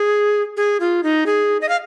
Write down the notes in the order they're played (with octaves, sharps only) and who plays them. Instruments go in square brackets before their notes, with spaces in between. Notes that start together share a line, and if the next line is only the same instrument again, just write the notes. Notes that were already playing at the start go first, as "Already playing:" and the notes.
Already playing: [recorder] G#4
G#4
F4
D#4
G#4
D#5
F5